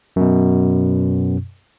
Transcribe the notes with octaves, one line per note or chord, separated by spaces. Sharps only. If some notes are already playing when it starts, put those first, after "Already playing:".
F#2 B2